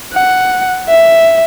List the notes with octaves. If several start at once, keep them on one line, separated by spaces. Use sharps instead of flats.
F#5
E5